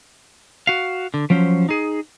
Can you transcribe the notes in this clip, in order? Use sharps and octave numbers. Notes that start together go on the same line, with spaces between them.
F#4 F5
D3
F3 F#3 C#4 C5
D#4 G#4